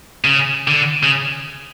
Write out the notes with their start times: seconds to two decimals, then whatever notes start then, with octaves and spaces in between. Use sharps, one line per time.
0.24 C#3
0.68 D3
1.03 C#3